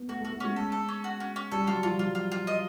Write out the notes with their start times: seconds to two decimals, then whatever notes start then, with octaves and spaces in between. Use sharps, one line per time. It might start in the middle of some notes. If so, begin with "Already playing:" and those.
Already playing: B3
0.08 A3 F#4
0.21 A3
0.25 F#4
0.33 A3
0.40 G#3 C#4
0.56 A4
0.72 A4
0.88 C#4
1.04 F#4
1.20 C#4
1.36 C#4
1.52 G3 A4
1.67 F#3 F4
1.83 F3 F4
1.99 F#3 F4
2.15 F4
2.32 F4
2.47 D#5